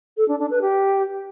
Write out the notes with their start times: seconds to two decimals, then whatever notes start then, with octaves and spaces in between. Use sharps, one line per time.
0.17 A4
0.28 D4
0.39 D4
0.50 B4
0.61 G4